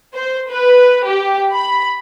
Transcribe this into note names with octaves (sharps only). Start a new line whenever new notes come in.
C5
B4
G4
B5